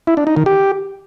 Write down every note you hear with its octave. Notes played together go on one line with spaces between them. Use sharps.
E4
D4
D#4
D#3
G4